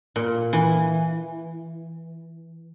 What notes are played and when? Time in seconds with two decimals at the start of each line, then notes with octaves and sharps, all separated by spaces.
0.16 A#2
0.53 E3